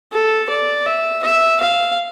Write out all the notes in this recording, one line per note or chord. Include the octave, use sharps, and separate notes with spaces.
A4
D5
E5
E5
F5